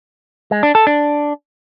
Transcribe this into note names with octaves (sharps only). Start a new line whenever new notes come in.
G#3
D4
A4
D4